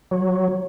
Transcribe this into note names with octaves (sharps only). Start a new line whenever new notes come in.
F#3